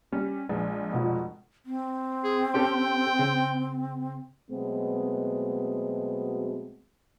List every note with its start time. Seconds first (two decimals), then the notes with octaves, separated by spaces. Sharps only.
0.12 G3 C#4
0.49 A#1 G#3
0.91 F1 B2 F3
1.66 C4
2.24 G#4
2.54 C#4 G4 A4 G5
3.19 C#3
4.50 B2 F#3 G#3 A3 B3 C4